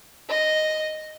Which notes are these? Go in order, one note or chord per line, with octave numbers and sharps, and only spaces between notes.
D#5